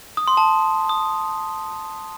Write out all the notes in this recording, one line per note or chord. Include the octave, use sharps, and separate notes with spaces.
D#6
C6
A5
D#6